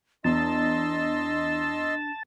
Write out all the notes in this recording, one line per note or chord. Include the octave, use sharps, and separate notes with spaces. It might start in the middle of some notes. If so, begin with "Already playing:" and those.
E2 D4 D#5 A5 C6 E6